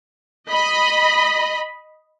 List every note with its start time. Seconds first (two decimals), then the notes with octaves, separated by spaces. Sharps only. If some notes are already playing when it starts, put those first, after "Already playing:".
0.50 D#5 B5